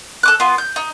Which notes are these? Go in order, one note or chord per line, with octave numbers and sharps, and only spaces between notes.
A4 D6 F#6
B3 F4
G6
D#4